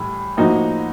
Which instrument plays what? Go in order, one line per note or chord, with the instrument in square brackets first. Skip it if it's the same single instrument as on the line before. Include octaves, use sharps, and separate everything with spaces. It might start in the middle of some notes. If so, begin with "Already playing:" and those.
Already playing: [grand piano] A2 E3 G3
A2 F3 A#3 D#4 F#4